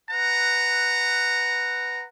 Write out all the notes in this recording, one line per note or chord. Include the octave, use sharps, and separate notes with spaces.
B4 F#5 A#5